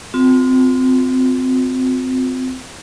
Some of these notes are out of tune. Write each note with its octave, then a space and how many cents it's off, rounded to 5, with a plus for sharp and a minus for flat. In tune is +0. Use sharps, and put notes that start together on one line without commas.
C4 -20 F4 +40